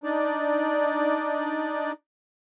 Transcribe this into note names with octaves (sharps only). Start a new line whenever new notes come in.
D4 D#4 D5